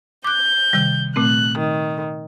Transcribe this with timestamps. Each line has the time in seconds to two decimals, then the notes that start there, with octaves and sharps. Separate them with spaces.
0.24 D6 F#6 G6
0.73 C3 D#3 G3
1.16 A#2 A3 C4 F#6
1.60 D#3